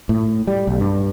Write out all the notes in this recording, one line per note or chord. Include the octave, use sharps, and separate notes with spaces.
A2
G3
B1
G2